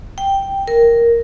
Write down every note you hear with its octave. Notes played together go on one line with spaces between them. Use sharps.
G5
A#4